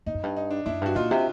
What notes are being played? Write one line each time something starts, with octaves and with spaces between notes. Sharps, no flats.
G2 D#4
F#2
G2
D#4
D4
F#2 D4 E4
G2 F#4
A#2 D#4 F4
C3